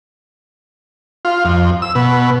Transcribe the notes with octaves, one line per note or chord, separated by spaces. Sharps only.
F4
F2
E6
B2